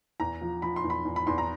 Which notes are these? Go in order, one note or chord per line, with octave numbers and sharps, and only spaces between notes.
E2 A#5
F3
F3 B5
C6
E2
B5
E2
B5
E2 C6
A#5